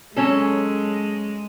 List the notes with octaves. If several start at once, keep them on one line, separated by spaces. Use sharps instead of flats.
F#3 G#3 C#4 A4